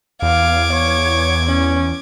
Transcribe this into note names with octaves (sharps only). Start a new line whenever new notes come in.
E2 F5 D6 G#6
C#5
C#4